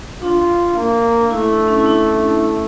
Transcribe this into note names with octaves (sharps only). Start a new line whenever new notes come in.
D4 F4
A#3
A3 E4
D4
C#4
E4
D4